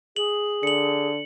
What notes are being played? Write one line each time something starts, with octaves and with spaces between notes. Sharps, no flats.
G#4 F#7
D3 C#7 F#7